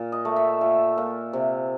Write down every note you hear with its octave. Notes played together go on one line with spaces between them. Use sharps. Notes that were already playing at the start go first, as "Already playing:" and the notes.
Already playing: A#2
D#5
A3
E5
A#2
A#2
C3